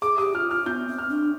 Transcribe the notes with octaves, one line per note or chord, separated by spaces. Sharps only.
G#4 D6
G4 D#6
F4 F6
F4 F6
B3 G6
C4
F6
D4